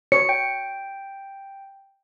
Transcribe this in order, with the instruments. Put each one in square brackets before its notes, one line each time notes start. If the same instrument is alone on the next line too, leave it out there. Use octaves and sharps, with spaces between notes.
[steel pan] C#5 [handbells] C#7
[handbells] G5